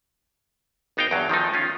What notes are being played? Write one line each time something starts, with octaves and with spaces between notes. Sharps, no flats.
G#1 B3 D#4 F5 G5
E2 G2 F#3
D#3 F3 A3 D#4
C#4 D#4 F4